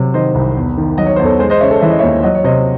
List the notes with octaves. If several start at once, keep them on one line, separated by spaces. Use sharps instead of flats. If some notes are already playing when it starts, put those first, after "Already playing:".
Already playing: C3 F#3
D#3 C5 D#5
C2
E2
D#3
F#3 D#5
C#5
E2 C5
A4 C#5
G#3 G#4 C5
C5 D#5
C#3 C#5 E5
A4 C#5
E3 E5
D#5
C#5 E5
D#2
F#3 D#5
C#5
C3 C5 D#5